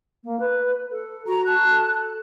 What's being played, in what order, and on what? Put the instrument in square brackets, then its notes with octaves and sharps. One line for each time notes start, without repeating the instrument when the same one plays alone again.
[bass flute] A#3
B4
A4
[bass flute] F#4 [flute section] A#5
[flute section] A5 F#6
[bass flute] A4